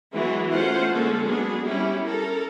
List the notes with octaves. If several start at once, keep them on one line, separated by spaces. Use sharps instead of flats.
E3 F#3 G#3 B3 E4 F#4
A3 C#4 F4 C5 F#5
D3 G#3 A#3 C#4 A4
F#3 G#3 B3 D4 G#4
G3 C#4 E4 G4
A4 A#4